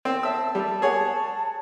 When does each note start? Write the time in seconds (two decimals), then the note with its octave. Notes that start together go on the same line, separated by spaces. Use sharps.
0.05 C4
0.23 E5 A5 E6
0.55 G3
0.82 G#4 C#5 F#5